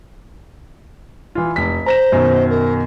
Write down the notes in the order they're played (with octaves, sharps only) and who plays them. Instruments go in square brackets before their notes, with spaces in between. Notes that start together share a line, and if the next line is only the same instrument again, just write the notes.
[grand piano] E3 F4
F1 B6
[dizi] C5 [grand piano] A#5 A#6 E7
[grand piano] F#2 B2 D#3
[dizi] A#4